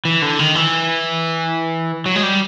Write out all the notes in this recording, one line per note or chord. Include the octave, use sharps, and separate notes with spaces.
E3
D3
D#3
E3
F#3
G#3
G3